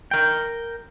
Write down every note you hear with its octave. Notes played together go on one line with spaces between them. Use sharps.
A#4 G5